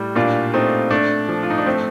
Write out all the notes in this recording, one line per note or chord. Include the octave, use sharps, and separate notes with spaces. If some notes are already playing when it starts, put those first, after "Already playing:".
Already playing: A2 G3
A#2 D4 F4
A3 C4 D#4
A3 D4
F3
F4
D#4
D4
A3 C4